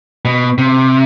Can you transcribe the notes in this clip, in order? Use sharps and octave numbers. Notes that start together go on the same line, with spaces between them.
B2
C3